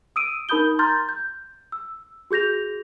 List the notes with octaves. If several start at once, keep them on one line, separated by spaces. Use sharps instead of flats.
D#6 E6 D7 D#7
D#4 A#4 B5 D#6 G6 G7
A#5 C6 F6 G6 A6
G6
E6
F#4 G#4 G6 A#6 F7